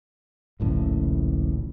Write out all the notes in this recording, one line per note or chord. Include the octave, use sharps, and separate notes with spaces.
D#1 A#1 A2 C#3